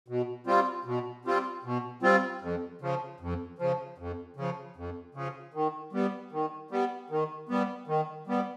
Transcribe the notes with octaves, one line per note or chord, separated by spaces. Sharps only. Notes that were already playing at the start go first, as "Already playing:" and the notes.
B2
G3 C4 F4
B2
G3 C4 F4
B2
G3 C4 F4
F2
C#3 F3
F2
C#3 F3
F2
C#3 F3
F2
C#3 F3
D#3
G3 B3
D#3
G3 B3
D#3
G3 B3
D#3
G3 B3